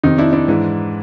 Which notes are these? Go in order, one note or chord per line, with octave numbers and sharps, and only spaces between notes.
F2 C3 D#3 D#4
D4 E4
D4 E4
G#2 E3